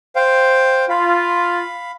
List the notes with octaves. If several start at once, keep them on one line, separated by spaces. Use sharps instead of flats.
C5 F5 G5
F4 F5 B5